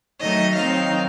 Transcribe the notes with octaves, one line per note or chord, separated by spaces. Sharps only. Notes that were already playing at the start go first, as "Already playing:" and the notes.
D#3 F#3 A3 D#4 D#5
D#3 F#3 C4 D#4 F5